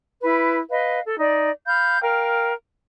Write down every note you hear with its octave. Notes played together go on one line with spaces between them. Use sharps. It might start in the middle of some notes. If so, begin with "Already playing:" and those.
E4 B4
B4 D#5 F5
A4
D#4 D5
F5 B5 G6
A#4 F5 G5